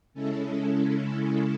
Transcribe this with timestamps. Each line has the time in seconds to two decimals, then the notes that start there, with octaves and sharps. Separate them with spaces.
0.14 C#3 G#3 C#4 E4 A4
0.55 A4
0.96 A4